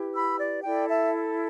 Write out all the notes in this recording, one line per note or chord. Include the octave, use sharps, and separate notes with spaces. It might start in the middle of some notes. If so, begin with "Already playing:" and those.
Already playing: E4 G4 B4
B5 E6
D5
E4 A4 D5 G5
E5 A5